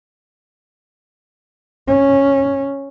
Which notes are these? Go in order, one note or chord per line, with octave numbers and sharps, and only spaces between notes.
C#4